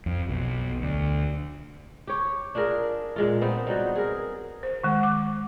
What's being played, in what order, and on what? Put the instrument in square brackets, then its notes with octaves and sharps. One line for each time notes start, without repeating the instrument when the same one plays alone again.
[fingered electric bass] F2
B1
D2
[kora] G4 C#5
D4 F4 G#4 A#4
A#2 G#3 F4
B3 C4 D#4
F#3 G3 D#4
G#4 A#4
[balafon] C5
D#3 G#3 F#5
D6